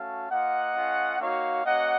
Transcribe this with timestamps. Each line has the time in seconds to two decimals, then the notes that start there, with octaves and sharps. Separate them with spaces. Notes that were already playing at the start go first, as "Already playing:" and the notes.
Already playing: A3 C#4 F#4 F5 A5
0.29 A#3 F4 D#5 F#5
0.75 A3 C#4 F4
1.19 A#3 D#4 F#4 C#5 F5
1.63 A#3 C#4 F#4 D#5 F#5